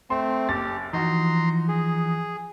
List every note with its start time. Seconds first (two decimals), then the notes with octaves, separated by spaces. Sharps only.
0.10 A3 C4 A5 C6
0.48 F#1 G4 A6
0.93 E3 F3 D#4 F#4 A#5 C6
1.68 G#4